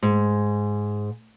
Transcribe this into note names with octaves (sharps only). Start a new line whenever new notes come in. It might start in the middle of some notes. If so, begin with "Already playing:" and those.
G#2